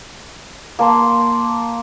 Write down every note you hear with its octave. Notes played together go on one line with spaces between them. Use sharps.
A#3 A5 C6